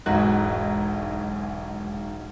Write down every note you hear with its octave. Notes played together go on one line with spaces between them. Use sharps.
E1 B1 G#2 F#4 F#6